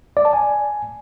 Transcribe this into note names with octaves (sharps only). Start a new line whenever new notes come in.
D5
A5
G#5